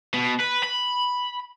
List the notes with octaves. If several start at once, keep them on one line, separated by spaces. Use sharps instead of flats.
B2
B4
B5